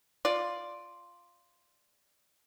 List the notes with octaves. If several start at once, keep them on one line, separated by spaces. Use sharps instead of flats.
F4 D5